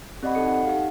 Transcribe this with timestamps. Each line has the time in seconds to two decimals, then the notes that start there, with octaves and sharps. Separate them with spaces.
0.23 C4 G4 D5 D#5 F#5 B5
0.35 D#4 A4 C#7
0.47 F#5
0.65 D#4 G4 F5